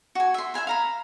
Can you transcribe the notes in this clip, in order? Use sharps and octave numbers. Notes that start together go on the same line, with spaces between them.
F#4 G#5
E5 C6
E5 F5 G#5 B5
F5 A#5 B5